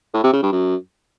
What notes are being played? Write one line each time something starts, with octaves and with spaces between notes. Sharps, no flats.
A2
C3
C#3
G2
F#2